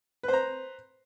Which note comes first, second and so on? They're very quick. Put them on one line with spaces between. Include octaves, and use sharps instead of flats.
B4 C5 A#5